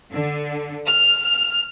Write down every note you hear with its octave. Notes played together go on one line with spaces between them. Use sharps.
D3
F6